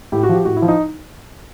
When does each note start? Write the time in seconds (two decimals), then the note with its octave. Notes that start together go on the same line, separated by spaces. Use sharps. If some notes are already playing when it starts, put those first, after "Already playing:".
0.12 A2 G4
0.23 F#4
0.29 F3 G4
0.45 A2 F#4
0.57 E4
0.62 F3
0.68 D#4